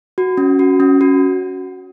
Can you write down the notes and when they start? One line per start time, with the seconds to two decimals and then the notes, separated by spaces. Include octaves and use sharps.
0.18 F#4
0.37 C#4
0.59 F#4
0.80 C#4
1.01 F#4